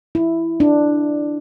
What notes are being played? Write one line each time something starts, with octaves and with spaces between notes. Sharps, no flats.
E4
D4